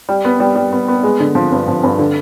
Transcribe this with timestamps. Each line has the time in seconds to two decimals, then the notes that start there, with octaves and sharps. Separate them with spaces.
0.09 G3
0.25 B3
0.40 G3
0.55 G3
0.73 B3
0.88 B3
1.03 G#3
1.20 D3
1.35 F3
1.52 G2
1.68 F3
1.83 G2
1.99 D3